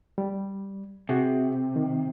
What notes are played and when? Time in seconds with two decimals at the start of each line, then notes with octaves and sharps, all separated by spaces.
0.18 G3
1.09 C3 F#4 G#4
1.76 D#3